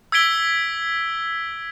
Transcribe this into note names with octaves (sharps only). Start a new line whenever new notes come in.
E6 G#6 B6 D7 G7